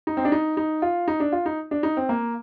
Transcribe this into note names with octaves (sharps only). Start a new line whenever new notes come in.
D#4
C4
D4
D#4
D#4
F4
D#4
D4
F4
D#4
D4
D#4
C4
A#3